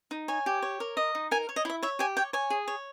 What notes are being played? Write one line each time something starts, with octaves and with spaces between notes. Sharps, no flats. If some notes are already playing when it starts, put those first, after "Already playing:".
D#4
C#5 G#5
G4
C#5
A#4
D#5
D#4
A#4 G#5
C#5
D#5
E4 E5
C#5 E5
G4 G#5
C#5 G5
C#5 G#5
G#4
C#5